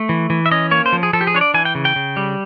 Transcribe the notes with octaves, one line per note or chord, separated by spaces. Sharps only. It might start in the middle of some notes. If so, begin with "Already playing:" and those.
Already playing: A3
E3
E3
E5
C#4 D#5
A#3 C#5
C5
F3
G#4
F3 A4
G4
G#4
D4 C#5
D5
E3 G#5
G5
C#3
G5
C#3
G3